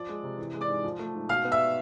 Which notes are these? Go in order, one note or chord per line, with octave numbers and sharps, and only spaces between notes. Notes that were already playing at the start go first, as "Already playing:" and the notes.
Already playing: F3 D5
G#3
C3
E3
G#3
D5 D6
G#2
F3
A3
G#2
B2 F5 F6
B3
E5 E6